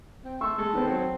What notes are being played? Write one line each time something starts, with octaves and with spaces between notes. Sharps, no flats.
C4
A3 C6 C#6 E6
G#3 A4
D#3 B3 C4
F#3 C4